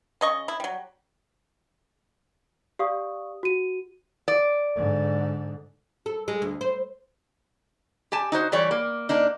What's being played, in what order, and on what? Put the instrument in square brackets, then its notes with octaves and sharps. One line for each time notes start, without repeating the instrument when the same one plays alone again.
[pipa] C#3 D#5 C#6
E4
F#3 G3
[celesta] G4 D5 F5 C#6 D#6
F#4 D#7
[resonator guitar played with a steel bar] D5
[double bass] G#2 D3
[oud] A4
G#3
D2
C5
[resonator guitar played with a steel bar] G4 G#5 A5
D#4 F#4 C5
E3 G3 C#5 D5
A#3
A#3 D4 D#4